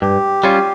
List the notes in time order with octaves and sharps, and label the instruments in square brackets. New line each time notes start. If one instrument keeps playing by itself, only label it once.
[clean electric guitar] G2 [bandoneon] G4
[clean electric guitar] G3 C#4 F4